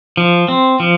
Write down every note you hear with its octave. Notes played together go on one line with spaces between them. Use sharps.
F3
C4
F3